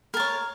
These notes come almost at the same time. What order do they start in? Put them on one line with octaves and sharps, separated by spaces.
A#4 A5 C#5